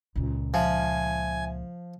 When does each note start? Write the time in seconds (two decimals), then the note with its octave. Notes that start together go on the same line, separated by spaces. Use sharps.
0.16 C#2 A#2
0.54 F3 E5 G#5